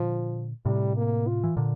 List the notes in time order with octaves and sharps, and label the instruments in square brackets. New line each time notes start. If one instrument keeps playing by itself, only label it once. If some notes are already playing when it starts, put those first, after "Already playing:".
Already playing: [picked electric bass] A#2 D3 [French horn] F3
[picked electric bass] A2 C3 [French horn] G3
[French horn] A#3
F4
[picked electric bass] E3
A#2 D3